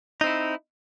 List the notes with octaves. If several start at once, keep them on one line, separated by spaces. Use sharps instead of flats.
C4 D#4 E4